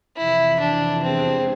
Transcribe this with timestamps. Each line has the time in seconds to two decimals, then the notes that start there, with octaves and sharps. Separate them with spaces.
0.17 F2 C3 E3 E4
0.60 D4
1.02 E2 C3 G#3 C4 D4 G#4